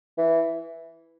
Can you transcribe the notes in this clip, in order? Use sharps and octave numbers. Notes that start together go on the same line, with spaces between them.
E3